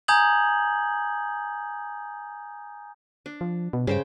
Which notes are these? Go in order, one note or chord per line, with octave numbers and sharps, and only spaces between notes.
G#5 A#5 D#6 G6 G#6 F#7
D4
F3
B2
G2 C#3 C5 G5